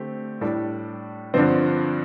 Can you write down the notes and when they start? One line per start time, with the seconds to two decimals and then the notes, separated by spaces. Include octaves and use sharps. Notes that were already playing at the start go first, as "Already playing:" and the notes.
Already playing: D3 A3 C4 G4
0.41 A2 G3 D4 A4
1.34 G2 D3 F3 C4